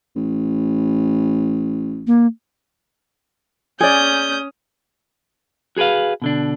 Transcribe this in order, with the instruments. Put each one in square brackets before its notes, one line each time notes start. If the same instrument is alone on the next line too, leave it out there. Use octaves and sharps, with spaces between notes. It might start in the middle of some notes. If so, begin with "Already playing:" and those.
[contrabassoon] A1
[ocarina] A#3
[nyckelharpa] C#4 D#6 [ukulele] G#4 D5 [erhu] G6
[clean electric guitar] F#4 G#4 A#4 B4 F5
B2 D3 D4